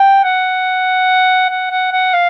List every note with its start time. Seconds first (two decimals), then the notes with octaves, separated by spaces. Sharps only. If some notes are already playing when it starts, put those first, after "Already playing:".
Already playing: G5
0.24 F#5
1.50 F#5
1.71 F#5
1.92 F#5
2.13 F5